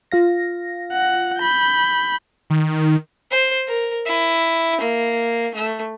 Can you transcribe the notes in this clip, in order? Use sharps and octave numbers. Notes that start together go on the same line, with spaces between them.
F4 F5 A#6
F#5
B5 G6
D#3
C5
A#4
E4
A#3
A3